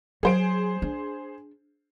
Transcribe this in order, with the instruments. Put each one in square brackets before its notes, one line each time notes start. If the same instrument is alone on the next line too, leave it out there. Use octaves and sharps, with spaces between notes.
[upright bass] F#3 [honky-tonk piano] G#4 C5 D7
[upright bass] D4